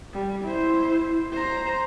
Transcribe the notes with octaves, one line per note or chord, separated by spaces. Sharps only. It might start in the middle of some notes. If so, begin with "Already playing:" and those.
G3
E4 C5
C5 A#5